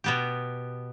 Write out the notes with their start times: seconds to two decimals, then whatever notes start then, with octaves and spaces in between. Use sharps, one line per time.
0.04 B2 B3 G4